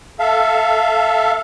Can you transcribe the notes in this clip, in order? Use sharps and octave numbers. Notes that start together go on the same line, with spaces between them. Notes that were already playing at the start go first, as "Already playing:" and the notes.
A4 E5 F5